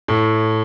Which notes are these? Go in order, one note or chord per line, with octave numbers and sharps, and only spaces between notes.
A2